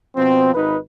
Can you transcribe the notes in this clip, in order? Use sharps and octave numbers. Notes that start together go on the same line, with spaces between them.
B2 F3 C4
G#1 D#4 B4